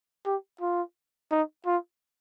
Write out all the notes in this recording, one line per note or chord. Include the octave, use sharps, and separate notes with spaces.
G4
F4
D#4
F4